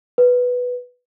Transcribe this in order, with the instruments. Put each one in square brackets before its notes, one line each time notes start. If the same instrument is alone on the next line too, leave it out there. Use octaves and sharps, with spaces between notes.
[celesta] B4